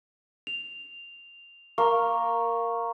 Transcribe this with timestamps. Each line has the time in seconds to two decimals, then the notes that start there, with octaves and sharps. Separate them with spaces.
0.47 F7
1.78 A#3 A#5 C#6